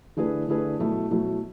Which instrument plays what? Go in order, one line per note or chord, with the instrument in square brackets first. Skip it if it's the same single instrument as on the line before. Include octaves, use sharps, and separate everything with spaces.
[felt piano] D3 A3 E4 G#4 B4
D3 A3 E4 G#4 B4
B2 F#3 A3 E4
B2 F#3 A3 E4